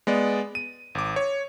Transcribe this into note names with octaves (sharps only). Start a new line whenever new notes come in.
G#3 B3 D5
D#7
G#1 D6
C#5